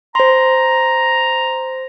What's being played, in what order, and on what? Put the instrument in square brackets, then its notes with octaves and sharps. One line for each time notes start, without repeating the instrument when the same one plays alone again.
[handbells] C5 C6 [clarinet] A#5